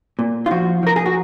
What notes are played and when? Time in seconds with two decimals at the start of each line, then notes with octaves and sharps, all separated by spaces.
0.19 A#2
0.46 F4
0.51 F3 F#4
0.83 F3 A#4
0.96 G#4
1.06 F#4